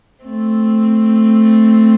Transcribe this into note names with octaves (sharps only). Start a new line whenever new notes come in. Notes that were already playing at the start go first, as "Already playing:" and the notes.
A3 C4